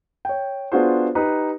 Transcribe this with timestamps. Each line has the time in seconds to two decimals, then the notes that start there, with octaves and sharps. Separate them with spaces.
0.25 C#5 G5
0.72 B3 D4 F4 F#4 G#4 C5
1.15 D#4 G4 B4